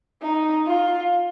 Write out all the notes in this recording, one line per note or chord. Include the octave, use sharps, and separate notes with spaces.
D#4
F4